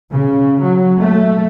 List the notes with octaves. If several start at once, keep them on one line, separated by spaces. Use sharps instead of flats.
C#3
F#3
A3